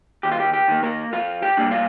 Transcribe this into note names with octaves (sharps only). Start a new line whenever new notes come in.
D#2 G4
F4
G4
G4
D#3 A#3
A#3 A#4
F2 F4 F5
G4 G5
C3 G3 A#3 D4
F4 F5